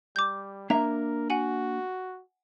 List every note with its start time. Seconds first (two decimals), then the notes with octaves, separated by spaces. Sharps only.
0.16 G3 D6 G6
0.70 A#3 D4 A#4 E5 A#5
1.30 F#4 F#5 G#5 F#7